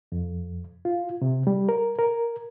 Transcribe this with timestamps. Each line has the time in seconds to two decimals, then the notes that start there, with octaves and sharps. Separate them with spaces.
0.12 F2
0.85 F4
1.22 C3
1.47 G3
1.69 A#4
1.99 A#4